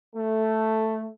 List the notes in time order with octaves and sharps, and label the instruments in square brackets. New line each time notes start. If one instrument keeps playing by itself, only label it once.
[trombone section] A3